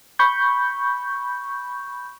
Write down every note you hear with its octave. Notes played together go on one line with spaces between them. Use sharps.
B5 C#6 G6